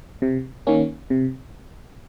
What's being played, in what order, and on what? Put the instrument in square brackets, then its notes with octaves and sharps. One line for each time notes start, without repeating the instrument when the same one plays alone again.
[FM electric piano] C3
D#3 A#3 C#4
C3